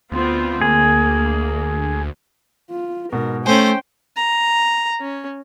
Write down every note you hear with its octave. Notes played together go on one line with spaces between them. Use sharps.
D2 B3 C4 F4
A#3 G#4
F4
G#2 B2 A#4
A3 C#4 C5 G5 G#5
A#5
C#4